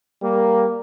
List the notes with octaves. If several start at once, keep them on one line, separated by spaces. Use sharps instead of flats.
G3 A#3